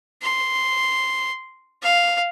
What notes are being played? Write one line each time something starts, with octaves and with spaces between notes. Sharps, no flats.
C6
F5